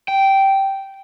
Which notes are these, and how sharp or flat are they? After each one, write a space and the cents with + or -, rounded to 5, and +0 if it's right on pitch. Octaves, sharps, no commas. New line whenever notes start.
G5 -10